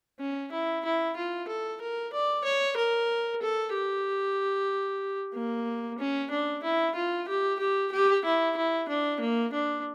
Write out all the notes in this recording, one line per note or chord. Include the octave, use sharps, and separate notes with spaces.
C#4
E4
E4
F4
A4
A#4
D5
C#5
A#4
A4
G4
A#3
C#4
D4
E4
F4
G4
G4
G4
E4
E4
D4
A#3
D4